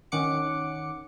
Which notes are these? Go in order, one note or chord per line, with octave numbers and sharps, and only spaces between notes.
D#3 C#4 F#5 D6 C#7